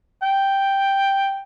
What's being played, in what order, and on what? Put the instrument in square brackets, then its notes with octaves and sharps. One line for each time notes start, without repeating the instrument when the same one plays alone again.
[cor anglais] G5